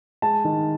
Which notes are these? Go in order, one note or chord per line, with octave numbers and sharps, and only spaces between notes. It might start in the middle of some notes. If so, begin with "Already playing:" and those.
G#3 A5
D#3